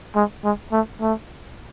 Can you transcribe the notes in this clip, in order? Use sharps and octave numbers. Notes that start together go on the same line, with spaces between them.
G#3
G#3
A3
A3